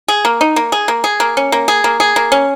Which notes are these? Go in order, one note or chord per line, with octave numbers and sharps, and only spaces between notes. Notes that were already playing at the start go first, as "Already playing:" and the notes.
G#4
A#3
D#4
A#3
G#4
A#3
G#4
A#3
C#4
A#3
G#4
A#3
G#4
A#3
C#4